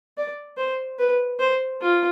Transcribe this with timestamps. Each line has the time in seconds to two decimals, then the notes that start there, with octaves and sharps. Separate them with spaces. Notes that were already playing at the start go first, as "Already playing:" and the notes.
0.17 D5
0.58 C5
0.99 B4
1.40 C5
1.81 F4